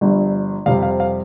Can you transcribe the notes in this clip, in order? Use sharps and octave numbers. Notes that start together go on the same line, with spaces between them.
G1 G2 F3
F2 C3 G3 F5
F5
F5